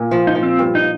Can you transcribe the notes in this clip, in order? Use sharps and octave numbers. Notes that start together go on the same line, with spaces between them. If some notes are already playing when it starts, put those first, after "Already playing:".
Already playing: A#2
F3
D#4
F3
C4
G2
D#4